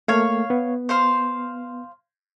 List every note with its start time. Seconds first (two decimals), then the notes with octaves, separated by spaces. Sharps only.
0.08 A3 A#3 C#5 F5
0.50 B3
0.89 C5 F5 C6